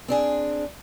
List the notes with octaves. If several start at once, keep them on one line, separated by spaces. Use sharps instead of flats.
C4 D4 G#4